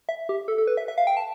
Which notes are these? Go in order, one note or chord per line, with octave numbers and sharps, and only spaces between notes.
E5
G4
A4
A4
B4
E5
E5
F5
G5
A5